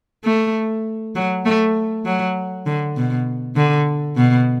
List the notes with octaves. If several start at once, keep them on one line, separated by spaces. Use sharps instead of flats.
A3
F#3
A3
F#3
D3
B2
D3
B2